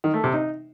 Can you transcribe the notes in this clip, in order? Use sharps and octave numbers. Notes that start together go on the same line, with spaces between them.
D#3
A3
C3
D#4